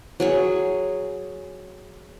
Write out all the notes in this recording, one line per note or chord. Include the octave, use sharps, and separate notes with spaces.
F#3 G#4 C#5